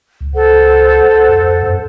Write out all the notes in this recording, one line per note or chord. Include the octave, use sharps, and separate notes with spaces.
C#2
A4 C5 F#5
F2
F#2